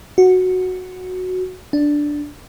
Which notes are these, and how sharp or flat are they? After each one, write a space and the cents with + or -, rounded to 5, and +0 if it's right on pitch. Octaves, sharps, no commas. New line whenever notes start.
F#4 -5
D4 +0